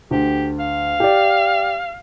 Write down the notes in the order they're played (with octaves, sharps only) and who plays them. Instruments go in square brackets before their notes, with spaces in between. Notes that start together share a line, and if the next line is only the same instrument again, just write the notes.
[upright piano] D2 [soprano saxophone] G4
[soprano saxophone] F5
[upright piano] G4 D5